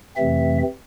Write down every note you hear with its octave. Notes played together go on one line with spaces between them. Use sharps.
F2 C3 E3 A3 C4 E5